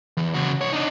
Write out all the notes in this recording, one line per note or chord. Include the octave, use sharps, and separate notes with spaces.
E2
C#3 F#4
C2 C#5
D4 D#4